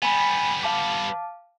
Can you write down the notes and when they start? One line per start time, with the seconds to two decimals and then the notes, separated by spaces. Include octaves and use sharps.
0.03 G3 B3 G#5 B5
0.63 F5 A5 D6